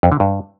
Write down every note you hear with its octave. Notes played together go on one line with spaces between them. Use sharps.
F2
D3
G2